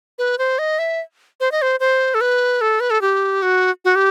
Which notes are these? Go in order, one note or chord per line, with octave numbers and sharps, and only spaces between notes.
B4
C5
D#5
E5
C5
D#5
C5
C5
A4
B4
A4
B4
A4
G4
F#4
F#4
G4